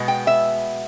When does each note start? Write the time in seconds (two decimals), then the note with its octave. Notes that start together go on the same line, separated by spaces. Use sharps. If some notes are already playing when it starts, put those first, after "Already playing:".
Already playing: B2 G#3 B3
0.08 G5
0.27 E5